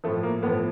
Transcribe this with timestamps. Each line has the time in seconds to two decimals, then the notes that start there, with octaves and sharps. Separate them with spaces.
0.04 A2 F3 A3
0.23 A#3
0.43 A2 B3
0.47 F3